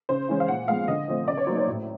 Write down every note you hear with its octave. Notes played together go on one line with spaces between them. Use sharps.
C#3 C5
E3 G#3 C#4
F5
A#2 F#5
F3 G#3 B3 F5
D3 D#5
F3 A3 C4
C#3 D5
C#5
F#3 A#3 D#4 C5
C#5
A2